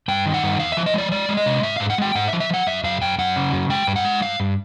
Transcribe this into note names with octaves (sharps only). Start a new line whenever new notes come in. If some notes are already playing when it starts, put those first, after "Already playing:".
G2 G5
D#3
F#5
G2
E2 F5
F3 E5
D#5
G#3 D5
G#3 D5
G#3
D#5
C3
G#2 E5
G#2 F5
F#5
G#3 G5
G#2 F#5
E5
F3
E5
F3 F#5
F#2 E5
F#2 F5
F#2 G5
F#2 F#5
C#3
F#2
G#3 G5
G2
F#5
G#3
G2 F5
G2